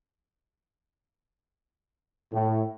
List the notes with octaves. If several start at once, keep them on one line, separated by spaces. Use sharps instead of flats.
A2